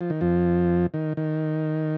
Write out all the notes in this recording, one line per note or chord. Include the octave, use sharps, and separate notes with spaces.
F3
D#3
F2 F3
D#3
D#3